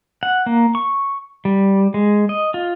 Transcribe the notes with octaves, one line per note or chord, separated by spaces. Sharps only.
F#5
A#3
C#6
G3
G#3
D#5
F4